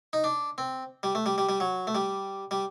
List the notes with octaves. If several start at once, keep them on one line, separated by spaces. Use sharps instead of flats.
D#4
D4
C4
G3
A3
G3
G3
G3
F#3
A3
G3
G3